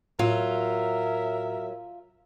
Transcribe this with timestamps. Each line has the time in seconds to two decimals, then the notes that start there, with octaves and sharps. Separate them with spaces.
0.19 A2 F#3 F4 A#4 E5